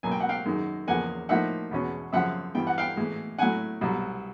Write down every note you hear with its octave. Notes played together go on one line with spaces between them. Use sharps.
C#2 B2 F#3 A#3 G#5
G5
F#5
F5 G5
F#2 D#3 G#3
E2 C#3 F3 A#3 F#5 G#5
A2 F3 A#3 D#4 E5 F#5
E2 B2 G#3 C#4
F#2 C#3 F3 E5 F#5
G2 E3 G3 B3 G5
F#5
F5 G5
A2 E3 G#3
A2 F#3 A3 F#5 G#5
C2 B2 F#3